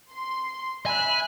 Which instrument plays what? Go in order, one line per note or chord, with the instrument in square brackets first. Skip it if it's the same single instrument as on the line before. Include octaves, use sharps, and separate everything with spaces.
[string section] C6
[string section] E5 B5 F#6 [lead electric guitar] G#5